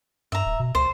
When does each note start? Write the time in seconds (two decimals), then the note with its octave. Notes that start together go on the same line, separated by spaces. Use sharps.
0.32 G2 E5 A#5
0.45 D1
0.59 B2
0.75 C#2 C5